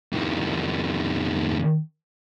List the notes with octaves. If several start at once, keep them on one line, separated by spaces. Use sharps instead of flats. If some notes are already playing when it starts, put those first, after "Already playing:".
F2 D#3